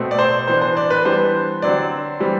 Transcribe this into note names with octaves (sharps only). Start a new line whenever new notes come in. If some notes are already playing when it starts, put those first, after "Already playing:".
Already playing: B2 A3 C4
D5
C5
E3 B3 D4 C5
C5
D5
B4
E3 G3 B3 D4 C5
D3 F#3 C4 D5
E3 G3 C4